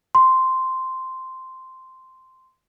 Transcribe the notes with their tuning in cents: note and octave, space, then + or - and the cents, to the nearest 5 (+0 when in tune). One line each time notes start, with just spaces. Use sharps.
C6 -5